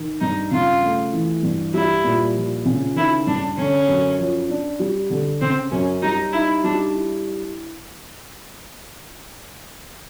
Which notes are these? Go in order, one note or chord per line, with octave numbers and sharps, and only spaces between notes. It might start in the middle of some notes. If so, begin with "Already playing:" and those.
Already playing: D#3
G2 D#4
C#3 F4
A3
E3
G2
G3 E4
A#2
F3
C#3
D#3 E4
G2 D4
D3 C#4
F#2
F3
D4
G3
D3
C#3 C4
F#2 C#4
G3 D#4
D#4 E4
G3 D4
E4